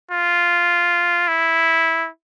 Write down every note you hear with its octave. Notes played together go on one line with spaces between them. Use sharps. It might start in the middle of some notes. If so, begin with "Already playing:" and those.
F4
E4